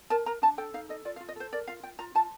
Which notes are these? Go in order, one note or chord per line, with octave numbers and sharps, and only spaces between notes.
A#4 A5
A#4 A#5
D4 A5
A4 G5
D#4 F5
A4 D#5
F4 D5
F5
F4
D#5
A4 C5
A#4 D5
F4 F5
F4 G5
F4 A#5
F4 A5